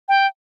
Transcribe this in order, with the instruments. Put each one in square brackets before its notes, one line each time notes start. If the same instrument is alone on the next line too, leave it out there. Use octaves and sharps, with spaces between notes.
[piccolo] G5